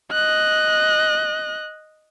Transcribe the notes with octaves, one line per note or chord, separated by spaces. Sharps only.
D#5 F#6